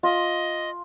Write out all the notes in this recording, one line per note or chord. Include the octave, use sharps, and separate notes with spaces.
F4 D#5